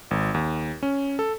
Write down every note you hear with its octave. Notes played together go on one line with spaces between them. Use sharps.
G#1
D#2
C#4
A4